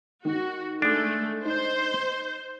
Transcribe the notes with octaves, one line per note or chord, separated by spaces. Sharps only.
D#3 F#4
G#3 A3 D4
D#4 C5